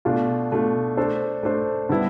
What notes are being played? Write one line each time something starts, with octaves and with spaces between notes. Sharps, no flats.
B2 A3 D4 F4
B2 A3 D4 F4
A3 D4 A4 C5
A3 D4 A4 C5
D3 G3 B3 E4